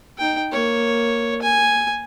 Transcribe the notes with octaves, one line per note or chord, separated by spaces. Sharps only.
D#4 G5
A#3 C#5
G#5